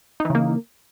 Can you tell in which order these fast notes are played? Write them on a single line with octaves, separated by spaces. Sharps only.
D#4 E3 C#3 A#3